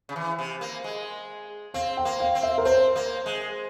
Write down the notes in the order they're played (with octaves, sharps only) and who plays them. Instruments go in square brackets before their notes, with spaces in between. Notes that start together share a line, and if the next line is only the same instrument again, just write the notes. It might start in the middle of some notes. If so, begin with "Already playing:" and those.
[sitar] C#3
E3
C3
A#3
G#3
[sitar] C4 [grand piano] F5
[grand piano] G5
[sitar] A#3
[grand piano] F5
[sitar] C4
[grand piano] E5
A#4
[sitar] C4 [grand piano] C5
[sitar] A#3
G#3